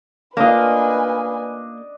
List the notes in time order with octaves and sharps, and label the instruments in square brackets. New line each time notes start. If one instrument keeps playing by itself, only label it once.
[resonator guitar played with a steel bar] A#3 F4 [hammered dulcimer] D4 D#5 [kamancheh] B4 G#5